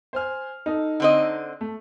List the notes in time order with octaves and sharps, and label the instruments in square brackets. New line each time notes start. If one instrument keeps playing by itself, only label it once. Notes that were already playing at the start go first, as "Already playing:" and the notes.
[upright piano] C5 G#5 F6
D#4 A4
[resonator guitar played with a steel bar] D3 C4 D#5
[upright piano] A3